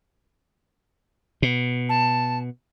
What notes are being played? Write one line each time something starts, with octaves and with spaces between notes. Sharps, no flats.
B2
A5